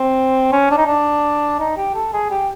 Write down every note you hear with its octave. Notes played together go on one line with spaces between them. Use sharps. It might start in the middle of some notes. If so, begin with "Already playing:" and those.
Already playing: C4
C#4
D4
D#4
D4
D#4
G4
A4
G#4
G4